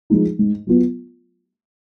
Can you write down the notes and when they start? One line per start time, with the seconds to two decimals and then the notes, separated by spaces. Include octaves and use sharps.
0.10 F3 G#3 D#4
0.39 G#2
0.67 F#3 B3 F4